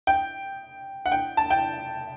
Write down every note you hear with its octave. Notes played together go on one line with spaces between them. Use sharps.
G5
F#5
G5
A5
G5